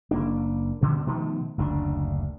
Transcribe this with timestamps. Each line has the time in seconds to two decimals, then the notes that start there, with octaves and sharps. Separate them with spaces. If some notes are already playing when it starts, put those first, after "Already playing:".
0.11 F#1 A#3 D4
0.81 D2 B2 D3
1.06 B2 D#3 F3 A3
1.58 F#1 D2 C#3 D4